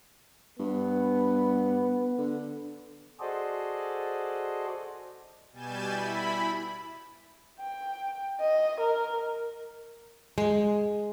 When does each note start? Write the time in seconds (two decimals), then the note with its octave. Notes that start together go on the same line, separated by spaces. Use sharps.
0.59 G2 B3
2.18 D3
3.20 F#4 G#4 A4 C5 D5 D#5
5.52 B2 G3 G#5 G6 A6 E7
5.86 E4 B5
7.59 G5
8.40 D#5
8.80 A#4
10.38 G#3